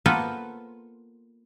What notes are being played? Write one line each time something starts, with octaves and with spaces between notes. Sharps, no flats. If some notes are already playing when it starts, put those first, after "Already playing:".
A#3 B3 F4 A4 B4 C5